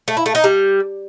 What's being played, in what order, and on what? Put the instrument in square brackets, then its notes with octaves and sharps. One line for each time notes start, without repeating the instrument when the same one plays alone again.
[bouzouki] A3
E4
A3
D#4
G3